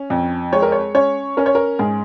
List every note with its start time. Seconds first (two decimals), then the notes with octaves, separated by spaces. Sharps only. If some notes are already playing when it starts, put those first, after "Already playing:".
Already playing: C#4
0.10 F2
0.53 G#3 C#5
0.62 A#4
0.72 C#5
0.95 C#4 C#5
1.37 C#4 A#4
1.46 C#5
1.55 A#4
1.79 G#2 G#4